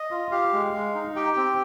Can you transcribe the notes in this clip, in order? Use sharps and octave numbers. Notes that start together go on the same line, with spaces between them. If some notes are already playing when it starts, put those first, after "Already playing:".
Already playing: D#5
F4
G4 F5
G#3
G#3
D#4
G4 G5
C4